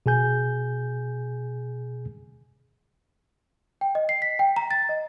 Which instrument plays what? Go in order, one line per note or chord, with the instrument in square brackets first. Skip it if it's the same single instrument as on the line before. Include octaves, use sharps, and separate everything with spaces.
[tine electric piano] B2 G#4 G#5 G6
[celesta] G5
D#5
C7
B6
G5
A#5
A6
D#5